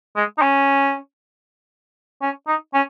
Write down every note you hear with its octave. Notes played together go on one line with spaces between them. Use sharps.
G#3
D#4
C#4
C#4
D#4
C#4